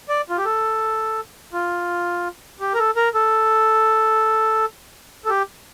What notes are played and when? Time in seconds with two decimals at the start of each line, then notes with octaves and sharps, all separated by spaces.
0.09 D5
0.30 F4
0.37 G4
0.45 A4
1.53 F4
2.60 G4
2.74 A#4
2.78 A4
2.96 A#4
3.14 A4
5.25 A4
5.30 G4